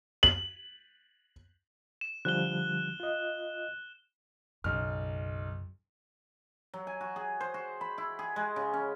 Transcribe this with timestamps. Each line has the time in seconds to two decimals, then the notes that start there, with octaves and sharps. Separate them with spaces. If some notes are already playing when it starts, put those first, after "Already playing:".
0.23 F#7
2.01 E7
2.25 D3 F3 G3 F#6 G7
3.00 F4 D#5
4.64 B1 F#2 C#3 F6
6.74 F#3
6.87 G#5
7.01 F#4
7.16 G#4
7.41 C5
7.54 F#4
7.81 B5
7.98 E4
8.19 G#4
8.36 G#3
8.56 C#3
8.73 C#4